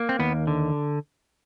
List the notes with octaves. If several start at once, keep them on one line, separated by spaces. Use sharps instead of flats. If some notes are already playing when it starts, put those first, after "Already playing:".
Already playing: A#3
C4
D#2 B3
D3